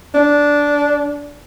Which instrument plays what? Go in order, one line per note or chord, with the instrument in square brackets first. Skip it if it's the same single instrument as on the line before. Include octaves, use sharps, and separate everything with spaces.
[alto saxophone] D4